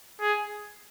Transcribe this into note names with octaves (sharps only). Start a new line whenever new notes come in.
G#4